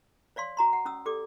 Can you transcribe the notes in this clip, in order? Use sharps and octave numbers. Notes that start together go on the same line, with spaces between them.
C#5 D5 F5 C6
F#4 A#5 C6
F#5
C#4 D#6 E6
G4 A4 D5 D6